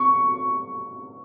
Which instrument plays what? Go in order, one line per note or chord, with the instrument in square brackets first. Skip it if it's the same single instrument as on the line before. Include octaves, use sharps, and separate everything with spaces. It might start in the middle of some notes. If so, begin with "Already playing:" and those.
Already playing: [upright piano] C#6